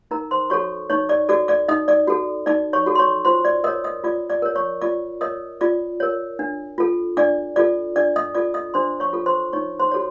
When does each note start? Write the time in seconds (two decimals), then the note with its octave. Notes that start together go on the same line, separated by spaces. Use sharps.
0.11 D#4 A#4 A#5
0.31 C5 C6
0.50 F#4 A4 C#5 C#6
0.90 D#4 C#5 C#6
1.09 D5 D6
1.29 F#4 A4 D5 D6
1.48 D5 D6
1.68 D#4 D#5 D#6
1.88 D5 D6
2.07 F#4 A4
2.46 D#4 D5 D6
2.73 C#5 C#6
2.86 F#4 A4
2.95 C6
2.99 C#5 C#6
3.25 F4 C5 C6
3.45 D5 D6
3.64 A#4 C#5 D#5 D#6
3.84 D#5 D#6
4.04 F4 D5 D6
4.30 D5 D6
4.42 A#4 C#5
4.55 C#5 C#6
4.82 F4 D5 D6
5.21 A#4 C#5 D#5 D#6
5.61 F4 D5 D6
6.00 A#4 C#5
6.39 D4
6.78 F4 A4
7.17 D4 D5 D6
7.56 F4 A4 D5 D6
7.96 D4 D5 D6
8.16 D#5 D#6
8.35 F4 A4 D5 D6
8.54 D#5 D#6
8.74 D4 C5 C6
9.00 C#5 C#6
9.13 F4 A4
9.26 C5 C6
9.53 D#4 C#5 C#6
9.79 C5 C6
9.91 F#4 A4 C#5